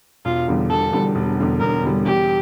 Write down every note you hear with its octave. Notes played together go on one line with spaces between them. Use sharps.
E1 F4
E2 D3 G3
E1 A4
E2 D3 G3
E1
E2 D3 G3
E1 A#4
E2 D3 G3
E2 G4